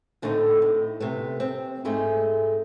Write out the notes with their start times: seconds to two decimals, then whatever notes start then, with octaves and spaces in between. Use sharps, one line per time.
0.22 A2 D3 A3 C4 D#4
0.62 A2
1.00 C3 A3 B3
1.40 C4
1.85 G#2 G#3 A3 D#4